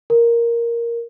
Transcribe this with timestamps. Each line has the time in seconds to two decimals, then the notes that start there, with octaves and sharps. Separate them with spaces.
0.10 A#4